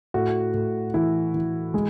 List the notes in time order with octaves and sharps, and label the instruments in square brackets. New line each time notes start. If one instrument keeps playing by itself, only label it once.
[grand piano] A2 F#4
A2
E3 E4
E3
G#3